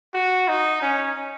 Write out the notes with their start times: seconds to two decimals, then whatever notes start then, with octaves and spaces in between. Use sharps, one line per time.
0.14 F#4
0.48 D#4
0.82 C#4